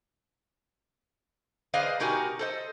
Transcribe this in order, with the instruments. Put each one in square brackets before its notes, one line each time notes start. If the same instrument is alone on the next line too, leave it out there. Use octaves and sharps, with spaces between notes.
[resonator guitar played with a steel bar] G#4 B4 C5 D5 D#5 F5
B2 D#4 F#4 G4 A#4 G#5
A4 C5 D#5